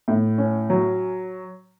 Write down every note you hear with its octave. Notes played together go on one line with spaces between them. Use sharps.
A2
C#4
F#3